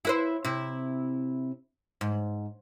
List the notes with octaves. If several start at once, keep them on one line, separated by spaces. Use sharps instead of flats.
E4 B4 C5
C3 E4
G#2